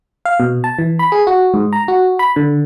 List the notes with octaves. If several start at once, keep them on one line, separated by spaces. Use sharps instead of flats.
F5
B2
A5
E3
B5
G#4
F#4
G#2
A#5
F#4
B5
D3